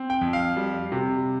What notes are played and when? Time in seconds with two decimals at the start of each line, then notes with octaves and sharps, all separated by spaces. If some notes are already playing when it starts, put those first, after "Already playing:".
Already playing: C4
0.10 G5
0.21 F2
0.33 F5
0.56 G3
0.92 C3